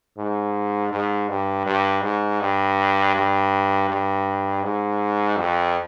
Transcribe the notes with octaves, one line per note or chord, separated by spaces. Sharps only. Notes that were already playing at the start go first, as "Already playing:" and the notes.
G#2
G#2
G2
G2
G#2
G2
G2
G2
G#2
F2